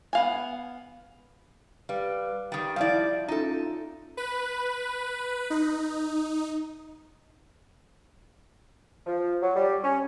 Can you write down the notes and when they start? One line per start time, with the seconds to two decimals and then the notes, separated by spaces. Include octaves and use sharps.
0.13 B3 F5 G#5
1.89 G3 B4 F5
2.52 D#3 G3 G5 D#6
2.76 F3 G3 E4 D5 F5 G6
3.28 C#4 D#4 F4 A4 E5
4.17 B4
5.50 D#4
9.06 F3
9.42 F#3
9.56 G3
9.83 C#4